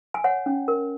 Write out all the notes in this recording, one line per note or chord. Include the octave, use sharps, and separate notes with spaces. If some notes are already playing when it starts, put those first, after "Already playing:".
G#5
C#5 F#5
C#4
A#4